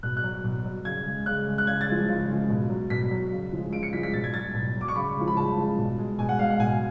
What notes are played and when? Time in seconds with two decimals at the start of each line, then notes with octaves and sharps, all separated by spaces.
0.03 B2 F#6
0.17 F#6
0.24 F#3
0.44 B2
0.65 F#3
0.85 C#3 G#6
1.06 G#3
1.26 C#3 F#6
1.47 G#3
1.58 F#6
1.67 C#3 G#6
1.81 A6
1.88 F3 G#3
2.08 C#3
2.29 F3 G#3
2.49 B2
2.70 F#3
2.90 B2 B6
3.11 F#3
3.32 C#3
3.52 F3 G#3
3.72 C#3 D7
3.83 C#7
3.93 F3 G#3 B6
4.03 B6
4.13 B2 A6
4.24 G#6
4.34 F#3 A6
4.54 B2
4.75 F#3
4.81 D6
4.88 C#6
4.96 C#3 B5
5.16 F3 G#3
5.28 B5
5.37 C#3 A5
5.57 F3 G#3
5.78 B2
5.98 G#3
6.19 B2 G#5
6.29 F#5
6.39 G#3 F5
6.50 F#5
6.60 B2 G#5